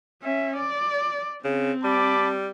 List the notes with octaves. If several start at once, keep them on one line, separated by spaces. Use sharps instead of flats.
C#4 E5
D5
C#3 C4
G3 A5 B5 D6